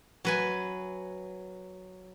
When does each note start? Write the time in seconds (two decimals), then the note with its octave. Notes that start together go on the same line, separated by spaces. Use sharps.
0.25 F#3 B4 G#5